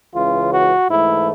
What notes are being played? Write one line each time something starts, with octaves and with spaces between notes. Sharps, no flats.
C#2 C#3 E3 F4
F#4
G#2 E3 A3 E4